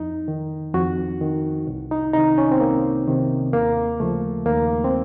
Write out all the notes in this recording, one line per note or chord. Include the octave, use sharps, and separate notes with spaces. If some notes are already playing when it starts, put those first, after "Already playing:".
Already playing: F2 D#4
D#3
F2 F#4
D#3
C2
D#4
C3 D#3 D#4
C#4
C4
C2 A#3
C3 D#3
D#2 A#3
C#3 F3 A3
D#2 A#3
C4